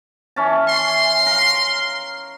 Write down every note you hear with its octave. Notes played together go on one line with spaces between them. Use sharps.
E3 C#4 A5
C6
A#4 F5